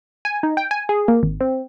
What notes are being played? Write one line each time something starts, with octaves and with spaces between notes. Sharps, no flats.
G#5
D#4
G5
G#5
G#4
A#3
G#1
C4